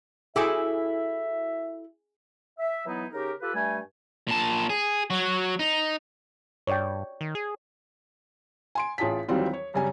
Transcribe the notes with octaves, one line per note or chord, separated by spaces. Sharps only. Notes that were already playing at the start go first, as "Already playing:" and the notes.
E4 F#4 G#4 A4 E5 G5 D6
E5
E3 F#3 B3 D#4 E4
C#3 D#4 G4 A#4
F4 G4 A4 B4
G2 G3 A3 G#5
A#2 A5
G#4
F#3 F#4
D#4
G2 C#5 D5 G5
D#3
G#4
G#5 C6 D7
A1 F4 G#4 A5 B6
D#2 E3 F#3 G3 C4 F4
C#5
F#2 C#3 G3 C#4 G#5